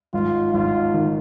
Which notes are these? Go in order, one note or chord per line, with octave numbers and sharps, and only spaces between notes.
G#1 F4
G#1 F4
D#3